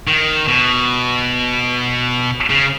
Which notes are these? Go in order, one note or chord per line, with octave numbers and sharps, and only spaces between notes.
D#3
B2
C#3